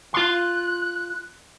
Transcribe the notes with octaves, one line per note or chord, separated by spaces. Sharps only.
F4 C6 F#6